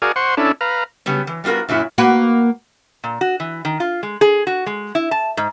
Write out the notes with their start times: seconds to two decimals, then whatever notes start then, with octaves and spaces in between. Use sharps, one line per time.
0.02 F#4 G#4 A#4 D5 F5 G#5
0.16 C5 F#5 C6 C#6
0.37 C#4 D4 E4 A4
0.61 B4 F5 A#5
1.06 C#3 F#3 G3 B3
1.27 E3
1.44 G3 B3 F4 F#4 A#4
1.69 F#2 A#2 F#3 E4
1.98 A#3 F#4 B4
3.04 A#2
3.21 F#4
3.40 E3
3.65 D#3
3.80 F4
4.03 G#3
4.21 G#4
4.47 F#4
4.66 G#3
4.95 E4
5.11 A5
5.37 G#2